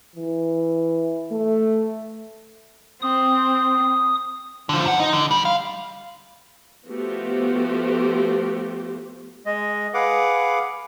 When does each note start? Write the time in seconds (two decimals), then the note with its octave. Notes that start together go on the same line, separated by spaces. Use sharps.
0.16 E3
1.32 A3
3.02 C4 D#6
4.69 D3 F3
4.85 F#2 F#5
5.00 D#4
5.13 D3
5.31 G3
5.45 F5
6.88 F3 A3 B3 F#4 G4 C5
9.46 G#3 D#5
9.94 G#4 B4 F5 F#5 D6